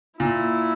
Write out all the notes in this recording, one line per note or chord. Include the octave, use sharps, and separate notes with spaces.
A#2 E4